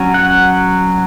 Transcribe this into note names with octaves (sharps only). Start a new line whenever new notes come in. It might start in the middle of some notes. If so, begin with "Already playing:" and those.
Already playing: F#3 C#4
F#5